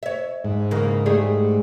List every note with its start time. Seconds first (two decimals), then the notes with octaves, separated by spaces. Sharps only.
0.03 C#5 E5
0.45 G#2
0.71 C#3 E3 A#3
1.06 G3 A3 G#4